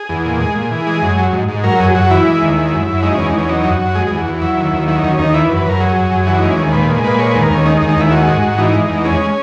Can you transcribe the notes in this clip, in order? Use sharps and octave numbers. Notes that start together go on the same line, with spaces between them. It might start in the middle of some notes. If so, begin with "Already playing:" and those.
Already playing: G#4
E2
A#2
G#3
A#2
E3
G#3
F#2
F#3
G#2
G#2
F#3 A#4
F#2 G#4
F#2 F#4
E3 E4
G#3
D#2
G#3
F#2
F#2
G#3 D#4
E2 C#4
D#4
E2 C#4
F#3 D#4
F#2
F#4
F#2
G#3 G#4
E2 G#4
F#4
E2
F#3 E4
D#2
D#2
F#3 E4
D#2 D#4
C#4
D#2 D#4
E3 E4
B4
F#2
B4
F#2 A#4
F#3 G#4
F#2
F#2
E3 F#4
G#3 D#4
C#4
D#2
A#2 B4
G#3
A#2 B4
G#3 C#5
D#2 B4
A#4
D#2 C#4
G#3 D#4
D#4
D#2
D#4
D#2 E4
G#3 F#4
G#2
G#2
E3 D#4
G#3
E2
G#3 C#4